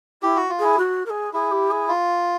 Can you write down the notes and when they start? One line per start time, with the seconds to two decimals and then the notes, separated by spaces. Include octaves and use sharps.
0.22 E4 G4
0.37 F#4
0.49 F4
0.59 E4 G#4
0.78 F#4
1.05 A#4
1.09 G#4
1.33 E4 G#4
1.51 G4
1.70 G#4
1.88 F4